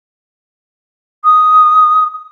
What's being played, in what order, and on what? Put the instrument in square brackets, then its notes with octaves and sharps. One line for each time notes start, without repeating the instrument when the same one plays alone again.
[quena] D#6